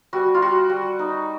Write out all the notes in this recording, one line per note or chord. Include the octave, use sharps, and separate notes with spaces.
G3 F#4
F4
G3 F#4
G3
D#4